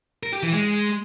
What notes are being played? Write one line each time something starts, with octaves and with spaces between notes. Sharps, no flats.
A#4
G4
E3
G#3